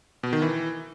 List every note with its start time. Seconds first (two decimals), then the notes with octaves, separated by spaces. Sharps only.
0.23 B2
0.33 D#3
0.42 E3